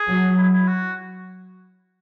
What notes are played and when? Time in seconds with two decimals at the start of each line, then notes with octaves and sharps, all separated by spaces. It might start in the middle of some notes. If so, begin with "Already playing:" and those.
Already playing: G#4
0.09 F#3
0.38 E4
0.52 E4
0.67 F#4